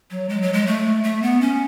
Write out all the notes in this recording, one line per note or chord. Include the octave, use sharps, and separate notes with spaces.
F#3
G#3
F#3
G#3
A3
A3
B3
C#4